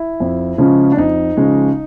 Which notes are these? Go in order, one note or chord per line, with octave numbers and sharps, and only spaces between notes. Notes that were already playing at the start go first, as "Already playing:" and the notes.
Already playing: E4
F2
C#3 F3 G#3 C#4
D4
F2 D#4
C#3 F3 G#3 C#4